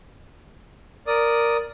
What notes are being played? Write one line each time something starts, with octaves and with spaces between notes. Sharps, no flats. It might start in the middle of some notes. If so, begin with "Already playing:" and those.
A#4 D5 D#6